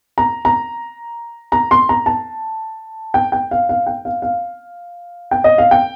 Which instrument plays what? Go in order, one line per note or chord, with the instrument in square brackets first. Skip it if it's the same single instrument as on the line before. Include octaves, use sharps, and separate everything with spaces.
[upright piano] A#5
A#5
A#5
C6
A#5
A5
G5
G5
F5
F5
G5
F5
F5
G5
D#5
F5
G5